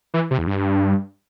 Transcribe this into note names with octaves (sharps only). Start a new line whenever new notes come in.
E3
C3
E2
G2